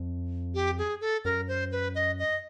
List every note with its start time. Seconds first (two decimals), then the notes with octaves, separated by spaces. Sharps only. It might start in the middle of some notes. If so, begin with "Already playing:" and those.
Already playing: F2
0.55 G4
0.78 G#4
1.01 A4
1.25 F#2 A#4
1.48 C5
1.72 B4
1.95 D#5
2.19 D#5